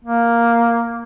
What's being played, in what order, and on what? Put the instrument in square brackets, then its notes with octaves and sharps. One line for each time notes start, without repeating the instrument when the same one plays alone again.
[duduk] A#3